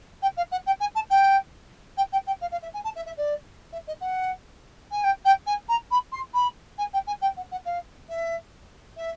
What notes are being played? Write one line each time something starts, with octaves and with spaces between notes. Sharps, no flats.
G5
F5
F#5
G5
G#5
A5
G5
G5
G5
G5
F5
F5
E5
G#5
A5
E5
E5
D5
E5
D#5
F#5
G#5
G5
G5
G#5
A#5
B5
C6
B5
G#5
G5
G#5
G5
F#5
F#5
F5
E5
E5